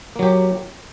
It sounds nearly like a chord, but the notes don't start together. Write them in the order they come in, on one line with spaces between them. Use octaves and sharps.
A#3 F#3 G4